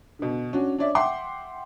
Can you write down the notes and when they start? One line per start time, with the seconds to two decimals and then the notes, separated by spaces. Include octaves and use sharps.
0.19 B2 D3
0.53 C#4 D4 F#4
0.78 D4 C#5 D5 E5
0.95 E5 F#5 G5 C6 D6